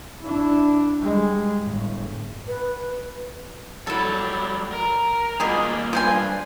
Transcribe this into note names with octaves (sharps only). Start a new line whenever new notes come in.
D4 E4
G3 G#3
G1 A2
B4
F#3 G3 E4 A4
A#4
B2 F3 G3 A#3 G#4
G2 F3 C5 G#5